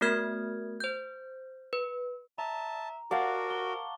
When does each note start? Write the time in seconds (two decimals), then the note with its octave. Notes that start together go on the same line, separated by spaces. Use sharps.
0.01 A3 B3 F#4 A#4 F6 G#6
0.80 C5 G6
1.73 B4
2.38 E5 A5 A#5
3.11 F#4 A#4 F5 F#5 A5 D6
3.50 C#6 G7